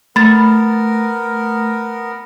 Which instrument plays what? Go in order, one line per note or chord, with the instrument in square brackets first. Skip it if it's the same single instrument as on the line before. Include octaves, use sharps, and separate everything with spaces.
[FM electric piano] A3 [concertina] B3 A#4 [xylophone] B5 A6